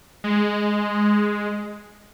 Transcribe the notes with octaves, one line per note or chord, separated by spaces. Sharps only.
G#3